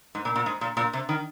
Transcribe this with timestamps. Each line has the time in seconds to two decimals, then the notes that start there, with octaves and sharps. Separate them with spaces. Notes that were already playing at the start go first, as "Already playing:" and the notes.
0.15 G#2
0.25 A#2
0.36 A#2
0.46 G#2
0.61 A#2
0.77 A#2
0.93 C3
1.09 D#3